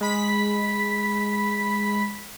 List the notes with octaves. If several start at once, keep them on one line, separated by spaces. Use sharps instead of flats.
G#3 B5 B6